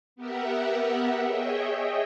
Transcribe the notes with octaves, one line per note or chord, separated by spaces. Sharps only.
B3 G4 A#4 E5 F#5
G#4 C#5 D#5 E5 G5